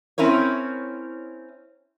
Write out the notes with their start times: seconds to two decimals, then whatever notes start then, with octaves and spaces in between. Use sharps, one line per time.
0.18 C4 C#4 E4 A#4 C#5